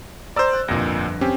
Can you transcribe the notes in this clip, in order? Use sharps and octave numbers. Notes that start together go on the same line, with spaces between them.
C5 D5 A#5 E6
F#6
G1 C2 F2 A#2 A#6
C4 C#4 G4